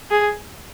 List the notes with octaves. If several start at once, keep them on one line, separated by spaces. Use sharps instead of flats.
G#4